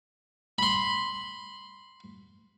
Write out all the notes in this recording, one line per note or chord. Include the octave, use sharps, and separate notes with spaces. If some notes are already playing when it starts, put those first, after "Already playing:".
B5 C6